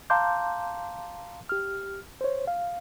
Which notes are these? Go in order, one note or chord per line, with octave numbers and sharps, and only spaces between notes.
F5 A5 A#5 C6 D6 G6
G4 F6
C5 C#5
F5